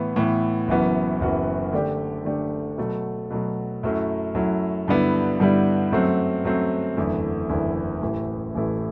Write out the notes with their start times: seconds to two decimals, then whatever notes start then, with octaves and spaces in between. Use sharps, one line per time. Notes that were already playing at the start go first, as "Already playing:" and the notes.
Already playing: A2 E3 B3
0.16 A2 E3 B3
0.68 F#1 F#2 E3 B3 F#4
1.21 F#1 F#2 E3 B3 F#4
1.73 D3 A3 D4 G4
2.25 D3 A3 D4 G4
2.78 B2 F#3 A3
3.31 B2 F#3 A3
3.83 F#2 F#3 A3 E4
4.35 F#2 F#3 A3 E4
4.88 G2 D3 G3 B3 E4
5.40 G2 D3 G3 B3 E4
5.92 F#2 F#3 A3 C4
6.45 F#2 F#3 A3 C4
6.97 F#1 E2 D3 A3 E4
7.49 F#1 E2 D3 A3 E4
8.02 A1 A2 E3 A3 E4
8.54 A1 A2 E3 A3 E4